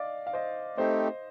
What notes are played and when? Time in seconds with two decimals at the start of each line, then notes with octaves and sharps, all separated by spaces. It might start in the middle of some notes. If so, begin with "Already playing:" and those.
Already playing: D5 D#5 F5
0.27 F5
0.33 C5 D#5
0.78 A3 C4 D#4 G4 C5 D#5